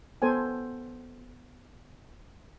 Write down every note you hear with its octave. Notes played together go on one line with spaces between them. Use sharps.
B3 A4 C5 G5 G#5